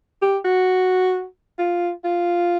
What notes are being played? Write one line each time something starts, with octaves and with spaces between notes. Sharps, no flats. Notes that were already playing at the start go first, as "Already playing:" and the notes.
G4
F#4
F4
F4